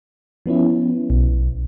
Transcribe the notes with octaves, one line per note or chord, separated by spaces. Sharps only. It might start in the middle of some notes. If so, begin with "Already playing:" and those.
F3 B3 C#4 E4
B1